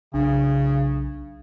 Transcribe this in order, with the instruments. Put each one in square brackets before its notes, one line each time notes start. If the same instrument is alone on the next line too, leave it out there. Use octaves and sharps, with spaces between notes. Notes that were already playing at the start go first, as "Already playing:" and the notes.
[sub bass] B1 [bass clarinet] C#3 [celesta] D4